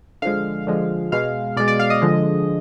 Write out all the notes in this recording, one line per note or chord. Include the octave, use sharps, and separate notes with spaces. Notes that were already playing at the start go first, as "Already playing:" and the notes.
D3 F3 G#3 F5
D3 F3 G#3
B2 G#3 F5
B2 G#3 D5
D5
F5
D#5
D3 F3 G#3